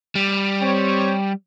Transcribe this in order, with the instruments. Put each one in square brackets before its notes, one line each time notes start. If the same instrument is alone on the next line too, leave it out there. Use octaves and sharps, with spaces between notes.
[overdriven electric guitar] G3
[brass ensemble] C4 G4 C#5